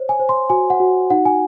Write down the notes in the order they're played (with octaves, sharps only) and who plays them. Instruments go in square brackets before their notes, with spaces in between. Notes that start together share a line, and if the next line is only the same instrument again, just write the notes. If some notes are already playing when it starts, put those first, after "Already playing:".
Already playing: [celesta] C5 C#5
G#5
C5
C6
F#4 G#5
F#5
F#4
D#4 F#5
G#5